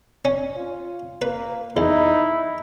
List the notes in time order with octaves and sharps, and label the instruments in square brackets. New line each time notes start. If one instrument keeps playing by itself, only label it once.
[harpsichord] C#4
[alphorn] F4
[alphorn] A#3 [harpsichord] B4
[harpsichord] E2 [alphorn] D#4 [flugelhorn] E4